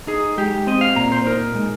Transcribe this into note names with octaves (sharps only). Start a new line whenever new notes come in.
D#4 G#4
G#3 G4
C4 D#5
F5
A#2 A#5
C5
D#4 A#4
G#3